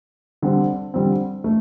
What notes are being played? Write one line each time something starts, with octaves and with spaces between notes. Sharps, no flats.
D3 G3 C4
D3 G3 C4
A3